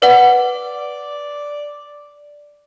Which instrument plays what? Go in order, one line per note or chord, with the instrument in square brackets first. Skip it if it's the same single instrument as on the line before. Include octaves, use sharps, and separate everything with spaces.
[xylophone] B4 F#5 [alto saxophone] D5